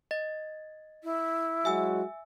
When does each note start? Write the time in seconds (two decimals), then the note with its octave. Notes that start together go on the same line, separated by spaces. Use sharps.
0.11 D#5 A6
1.04 E4
1.65 F#3 G#3 F#4 E5 G#5 E6